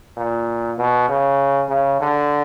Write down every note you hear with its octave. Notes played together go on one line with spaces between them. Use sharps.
A#2
B2
C#3
C#3
D3